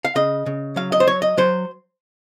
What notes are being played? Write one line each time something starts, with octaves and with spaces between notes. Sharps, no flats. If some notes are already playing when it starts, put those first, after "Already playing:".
F5
C#3 D#5
C#3
F#3 F5
D#5
C5
F#3 C#5
D#5
F#3 C5